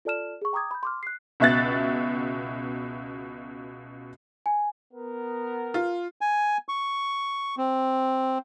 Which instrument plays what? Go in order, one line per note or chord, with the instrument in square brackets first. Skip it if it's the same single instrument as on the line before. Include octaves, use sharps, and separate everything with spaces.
[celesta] F4 A4 D5 A5 F6 E7
G#4 C#6
G5 A#5 D6 D#6 G#6
B5 G6
C6 D6 F6
F#6 C7
[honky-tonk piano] C#2 B2 E5 F#6 A6
[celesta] G#5
[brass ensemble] B3 A#4
[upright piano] F4
[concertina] G#5
C#6
C4